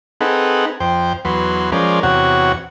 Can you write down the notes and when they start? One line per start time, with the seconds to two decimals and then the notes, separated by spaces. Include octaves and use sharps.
0.21 C4 D#4 G#4 A4 B4 F#5
0.80 F2 C5 G5
1.25 E2 F#3 B4 C6
1.72 F3 G#3 C#4 A#4 C5 D5
2.03 E2 C3 F#4 C#5 F#5